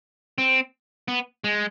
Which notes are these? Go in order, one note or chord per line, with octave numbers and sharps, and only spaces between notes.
C4
B3
G#3